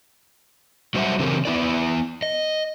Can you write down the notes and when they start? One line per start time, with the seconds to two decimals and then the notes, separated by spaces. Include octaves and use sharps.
0.95 F#3 G3 C5 D#5 E5 F#5
1.19 C#3 E3 C4 G4 A4 A#4
1.45 B3 E4 D5
2.22 D#5